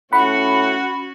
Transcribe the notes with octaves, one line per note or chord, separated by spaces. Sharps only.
A2 C#4 F#4 F#5 B5